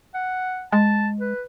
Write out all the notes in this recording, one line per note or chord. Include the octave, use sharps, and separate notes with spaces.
F#5
G#3 A5
B4